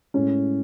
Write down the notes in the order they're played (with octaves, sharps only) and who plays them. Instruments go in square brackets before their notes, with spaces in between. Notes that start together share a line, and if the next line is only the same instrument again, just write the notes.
[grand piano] A2 G#3 C#4